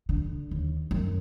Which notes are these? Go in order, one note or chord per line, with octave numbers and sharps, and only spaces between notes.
D3
D#2
F#2